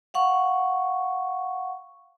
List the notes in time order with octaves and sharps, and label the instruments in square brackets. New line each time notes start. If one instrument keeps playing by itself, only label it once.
[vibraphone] F5 F#5 C#6